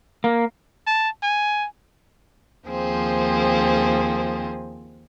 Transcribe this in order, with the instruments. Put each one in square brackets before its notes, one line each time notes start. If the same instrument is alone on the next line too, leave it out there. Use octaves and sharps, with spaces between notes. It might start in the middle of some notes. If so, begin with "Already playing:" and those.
[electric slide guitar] A#3
[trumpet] A5
G#5
[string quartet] D#2 F3 C4 G#4